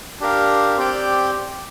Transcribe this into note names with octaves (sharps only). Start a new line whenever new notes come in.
D4 G4 A#4 F5
C4 G4 D5 G5